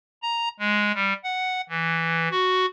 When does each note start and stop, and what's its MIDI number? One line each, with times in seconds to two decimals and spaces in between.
0.23 0.49 82
0.60 0.92 56
0.94 1.13 55
1.24 1.61 78
1.69 2.28 52
2.31 2.66 66